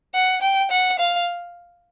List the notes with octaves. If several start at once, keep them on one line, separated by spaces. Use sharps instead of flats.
F#5
G5
F#5
F5